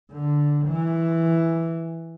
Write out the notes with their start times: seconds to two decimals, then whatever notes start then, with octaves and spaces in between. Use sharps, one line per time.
0.12 D3
0.67 E3